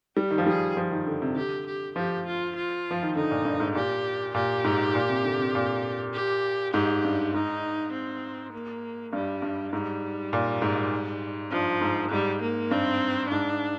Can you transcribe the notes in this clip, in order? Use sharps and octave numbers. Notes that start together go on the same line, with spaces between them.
G3 G4
D#3
F3
G3 G#4
F3
D#3
D3
C3
D3 G4
G4
F3 G4
F4
F4
F3
D#3
D3 D#4
A#2
G2
G#2
A#2 G4
A#2 G4
G#2
A#2
C3
D3
C3
A#2
G4
G#2 G4
G2
G#2 D#4
C4
A#3
G2 G3
G2
G#2 G3
A#2
G#2
G2 F3
G#2
G#2 G3
A#3
G2 C4
G#2 D4